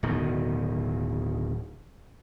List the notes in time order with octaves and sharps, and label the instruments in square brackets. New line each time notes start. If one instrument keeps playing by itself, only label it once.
[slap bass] D1 B2 D#3